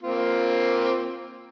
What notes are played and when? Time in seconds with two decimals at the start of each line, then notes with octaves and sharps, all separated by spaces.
0.03 A#3 C4 F4